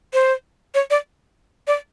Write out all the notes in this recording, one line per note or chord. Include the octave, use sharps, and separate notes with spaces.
C5
C#5
D5
D5